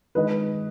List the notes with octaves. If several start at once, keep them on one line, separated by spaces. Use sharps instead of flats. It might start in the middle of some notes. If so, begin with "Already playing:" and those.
D#3 G#3 B4 D#5